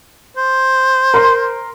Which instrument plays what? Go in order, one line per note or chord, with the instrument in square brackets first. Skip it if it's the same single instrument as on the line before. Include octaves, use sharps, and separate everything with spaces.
[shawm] C5
[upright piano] A#4 C6